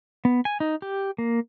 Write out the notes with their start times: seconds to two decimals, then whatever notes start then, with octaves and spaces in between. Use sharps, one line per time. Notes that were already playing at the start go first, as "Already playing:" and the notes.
0.25 B3
0.45 G#5
0.60 D#4
0.82 G4
1.18 A#3